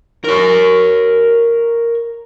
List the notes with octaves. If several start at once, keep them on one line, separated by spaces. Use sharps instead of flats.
A#4 C#5